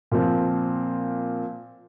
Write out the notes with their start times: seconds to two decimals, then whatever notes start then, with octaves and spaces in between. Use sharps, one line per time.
0.11 A#2 F3 C4